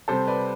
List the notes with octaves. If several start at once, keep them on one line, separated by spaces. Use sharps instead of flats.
C3 G3 C4 A4 C5
B4 D5